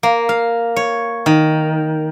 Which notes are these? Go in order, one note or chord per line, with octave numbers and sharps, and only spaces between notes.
A#3
F5
C#5
D#3